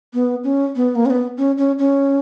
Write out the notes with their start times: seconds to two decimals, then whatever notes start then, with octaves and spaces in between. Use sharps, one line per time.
0.14 B3
0.44 C#4
0.76 B3
0.95 A#3
1.06 C#4
1.10 B3
1.37 C#4
1.58 C#4
1.79 C#4